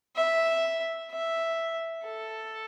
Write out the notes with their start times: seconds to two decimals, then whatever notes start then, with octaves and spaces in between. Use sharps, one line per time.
0.16 E5
1.11 E5
2.05 A4